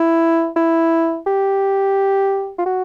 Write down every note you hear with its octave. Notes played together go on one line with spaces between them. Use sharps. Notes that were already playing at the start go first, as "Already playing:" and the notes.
Already playing: E4
E4
G4
F4
F#4